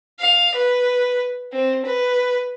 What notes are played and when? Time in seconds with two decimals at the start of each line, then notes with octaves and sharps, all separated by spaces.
0.20 F5
0.55 B4
1.52 C4
1.85 B4